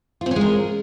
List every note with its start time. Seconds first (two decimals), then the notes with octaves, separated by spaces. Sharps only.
0.21 F4
0.26 C4
0.31 C#4
0.36 G#3
0.41 A#4